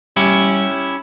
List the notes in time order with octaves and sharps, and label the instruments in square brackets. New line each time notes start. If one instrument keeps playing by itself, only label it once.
[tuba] G3 [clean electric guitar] C#4 E4 G4